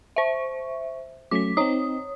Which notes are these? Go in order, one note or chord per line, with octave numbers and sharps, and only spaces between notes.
C5 E5 C#6
F#3 A3 C#4 D6 B6
C4 D#4 C#5 D#6